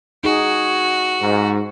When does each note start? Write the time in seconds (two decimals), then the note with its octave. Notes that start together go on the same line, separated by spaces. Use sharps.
0.24 D#4 F#4 G#4
1.21 G#2